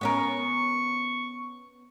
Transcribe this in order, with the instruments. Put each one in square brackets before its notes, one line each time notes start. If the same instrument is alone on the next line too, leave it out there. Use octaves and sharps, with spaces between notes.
[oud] B3 C#4 A#4 [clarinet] C#6